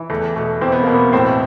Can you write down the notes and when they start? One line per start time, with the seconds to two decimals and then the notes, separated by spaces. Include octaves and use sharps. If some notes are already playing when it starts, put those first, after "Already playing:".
Already playing: E3
0.10 E2 A3
0.35 B2 A3
0.61 E2 C4
0.72 B3
0.83 B2 A#3
0.94 B3
1.13 A2 C4